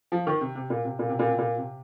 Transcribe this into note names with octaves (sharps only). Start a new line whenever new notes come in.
F3
D#3
C3
C3
A#2
C3
A#2
C3
A#2
C3
A#2
C3